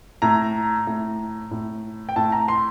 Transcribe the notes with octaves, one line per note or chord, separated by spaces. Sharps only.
A2 A#5
A2
A2
G5
A2 A5
A#5
C6